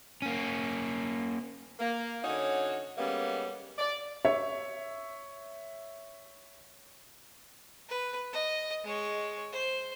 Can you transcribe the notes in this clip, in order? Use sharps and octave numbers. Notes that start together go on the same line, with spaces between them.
A#3 C#4
A#3
D3 C#4 D#4 F#4 C#5
G3 G#3 A#3 B3 C#4
D5
C#5 E5
B4
D#5
G#3 C#5
C5